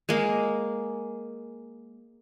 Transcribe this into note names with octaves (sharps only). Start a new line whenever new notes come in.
G#3 A#3